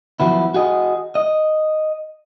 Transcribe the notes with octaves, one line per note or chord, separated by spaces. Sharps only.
F3 F#3 B3 E4
F#4 G#4 D#5
D#5